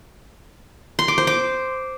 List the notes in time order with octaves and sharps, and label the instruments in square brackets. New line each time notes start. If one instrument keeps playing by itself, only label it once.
[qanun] C6
D6
C5
D6